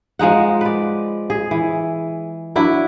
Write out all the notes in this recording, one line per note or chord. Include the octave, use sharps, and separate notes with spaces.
F3 G#3 D#4 F#5
B4 D5
G#4
E3
F#3 D4 E4